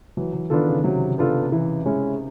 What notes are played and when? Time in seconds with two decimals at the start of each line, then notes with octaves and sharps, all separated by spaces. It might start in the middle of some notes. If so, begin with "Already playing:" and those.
0.17 E3 F#3
0.33 E3
0.50 D#3 B3 D4 F4 A4
0.67 C#3
0.84 C3 F#3
1.18 B3 D4 F4 A4
1.52 E3
1.85 G#3 C#4 E4